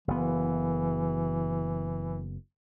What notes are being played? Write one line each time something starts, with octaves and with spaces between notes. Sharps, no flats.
F#1 E3 B3